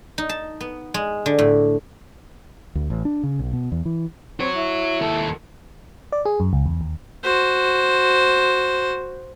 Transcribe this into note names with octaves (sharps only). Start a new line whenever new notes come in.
D#4
A5
B3
G#3
D3
A2
D2
A1
D4
C#3
B1
B2
E2
E3
C4 F#4 C#5
E4
D#2 A4
D5
G#4
F#2
C#2
E2
D#2
F#4 C5